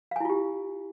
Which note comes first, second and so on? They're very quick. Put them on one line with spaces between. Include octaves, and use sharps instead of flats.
F5 G#5 E4 F4 G4